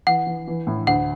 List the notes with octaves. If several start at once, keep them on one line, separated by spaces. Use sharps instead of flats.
E3 F#5
E3
E3
A2
D2 F#5